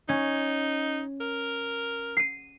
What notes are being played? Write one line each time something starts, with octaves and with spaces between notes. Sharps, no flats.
C#4 D#4
A#4
C7 D#7